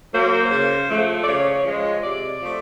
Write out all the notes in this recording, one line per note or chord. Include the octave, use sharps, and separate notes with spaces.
F#3 A#3 C5
C5
C#3
F3 A3
D5
C#3 C#5
C#5
F3 G#3
C#5
C3 D5
F3 A3